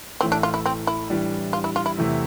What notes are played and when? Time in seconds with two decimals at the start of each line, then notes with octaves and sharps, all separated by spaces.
0.21 A1 A2 E3 A3 C4
0.32 D4
0.43 F4
0.54 E4
0.66 C4
0.87 E4
1.10 A2 E3 G3 D4
1.53 F4
1.64 E4
1.76 F4
1.86 E4
1.97 E2 C3 E3 A3 E4